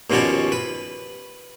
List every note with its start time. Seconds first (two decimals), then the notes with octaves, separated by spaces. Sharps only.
0.10 D#2 B2 F3 C#4 F#4 D5
0.52 B4